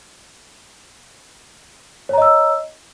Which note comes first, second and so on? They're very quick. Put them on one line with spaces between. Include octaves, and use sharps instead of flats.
C#5 A#5 D#5 E6